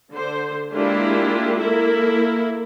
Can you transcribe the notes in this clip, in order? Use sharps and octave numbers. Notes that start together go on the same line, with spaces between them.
D3 C5
G#3 A#3 D4 E4 F4 G4
A#3 E4 A4 A#4 E5